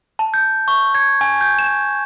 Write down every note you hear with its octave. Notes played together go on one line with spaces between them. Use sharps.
A5
G6
C#6
G#6
G#5
G6
E7